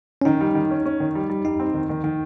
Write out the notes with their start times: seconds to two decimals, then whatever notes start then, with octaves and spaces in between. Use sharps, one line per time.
0.22 C#4
0.25 D#3 D#4
0.41 G3
0.55 D#3
0.70 C#4
0.85 C#4
1.00 D#3
1.15 G3
1.30 G3
1.45 G3 D#4
1.60 C4
1.74 D#3
1.89 D#3
2.04 D#3